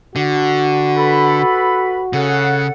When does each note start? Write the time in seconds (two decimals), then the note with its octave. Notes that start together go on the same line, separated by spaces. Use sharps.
0.16 D3 F#4
0.96 A4 B4 B5
2.13 C#3 A4 C#5 F#5